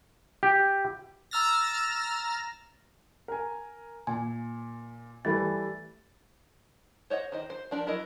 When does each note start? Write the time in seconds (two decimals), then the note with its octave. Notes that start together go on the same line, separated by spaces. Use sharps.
0.43 G4
1.31 A#5 E6 F6 A6 A#6
3.28 A#4 G#5
4.07 A#2 G#5
5.25 E3 G3 A3 A6
7.10 C5 C#5 D#5 F#5
7.32 D#3 C5 D#5
7.50 C5
7.71 F3 D4 A#4
7.87 F#3 E4 A#4 D#5